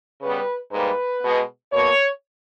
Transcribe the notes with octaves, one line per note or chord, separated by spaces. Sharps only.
C#3 G3 B3 B4
G#2 G3 A#3 B4
B2 G#3 B3
B2 A#3 C#5